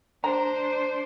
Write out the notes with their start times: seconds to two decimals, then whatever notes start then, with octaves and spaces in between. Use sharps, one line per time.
0.24 D4 C5 A#5